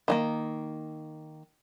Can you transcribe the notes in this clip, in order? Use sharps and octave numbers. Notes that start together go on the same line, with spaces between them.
D#3 G#3 A#3